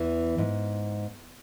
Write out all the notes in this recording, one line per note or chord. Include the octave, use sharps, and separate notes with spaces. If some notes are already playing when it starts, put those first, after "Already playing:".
Already playing: E2 E3
G#2